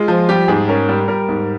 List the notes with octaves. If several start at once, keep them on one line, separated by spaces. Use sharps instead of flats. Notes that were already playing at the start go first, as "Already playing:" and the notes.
Already playing: G#3 F4
F3
G3 G4
G#2 G#4
C#4 A#4
G3
G3 A#4
G#2